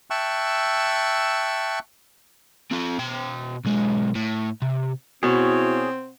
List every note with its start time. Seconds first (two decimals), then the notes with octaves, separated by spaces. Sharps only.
0.10 E5 G5 A5 C#6 E6 F#6
2.71 C4 F4
2.99 B2 G5
3.65 B1 G#3
4.15 A2
4.62 C3
5.23 B2 C4 E4 F#4 G#4 C#5